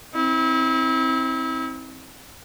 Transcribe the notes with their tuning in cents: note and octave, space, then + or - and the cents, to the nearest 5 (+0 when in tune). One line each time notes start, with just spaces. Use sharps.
C4 +15 E4 -35